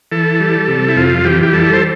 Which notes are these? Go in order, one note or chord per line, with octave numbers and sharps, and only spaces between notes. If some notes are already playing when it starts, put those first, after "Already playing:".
E3 A4
G3
C3
E4
F2 F4
E3 G4
G4
G3 A4
C5